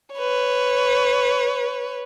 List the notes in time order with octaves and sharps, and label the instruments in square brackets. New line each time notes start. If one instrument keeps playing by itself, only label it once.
[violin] B4 C#5